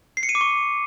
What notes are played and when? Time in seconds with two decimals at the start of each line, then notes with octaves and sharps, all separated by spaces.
0.17 C7
0.23 C#7
0.29 D#7
0.35 D6
0.41 C#6